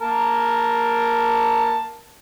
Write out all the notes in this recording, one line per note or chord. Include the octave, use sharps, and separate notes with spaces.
A#3 A#4 A5